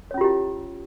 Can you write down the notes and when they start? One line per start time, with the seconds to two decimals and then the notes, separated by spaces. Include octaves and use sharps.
0.11 C#5
0.14 C#4
0.18 F4
0.21 G4
0.24 E4